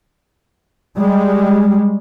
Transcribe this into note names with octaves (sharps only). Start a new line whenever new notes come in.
G3 G#3